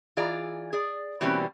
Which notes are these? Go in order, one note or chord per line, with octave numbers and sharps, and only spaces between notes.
E3 F4 G#4 D5 A#5
G#4 D5
B2 E3 G3 A#3 C4 C#4